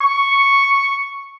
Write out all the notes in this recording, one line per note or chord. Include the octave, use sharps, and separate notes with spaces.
C#6